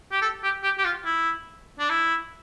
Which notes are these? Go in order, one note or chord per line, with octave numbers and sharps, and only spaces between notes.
G4
A4
G4
G4
G4
F4
E4
D4
E4